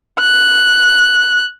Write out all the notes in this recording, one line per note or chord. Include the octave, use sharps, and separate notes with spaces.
F#6